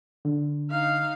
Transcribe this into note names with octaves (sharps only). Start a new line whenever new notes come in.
D3
D#4 F5